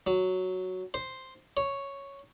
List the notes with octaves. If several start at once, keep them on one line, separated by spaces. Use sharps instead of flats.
F#3
C5
C#5